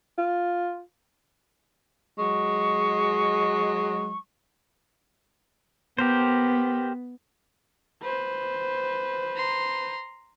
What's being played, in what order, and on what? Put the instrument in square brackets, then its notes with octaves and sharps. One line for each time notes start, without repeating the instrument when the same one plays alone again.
[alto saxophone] F4
[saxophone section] F#3 G#3 [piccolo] C#6
[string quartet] B3 [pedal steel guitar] G4 A#4 C5
[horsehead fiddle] B4 C5
[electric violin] A#5 C6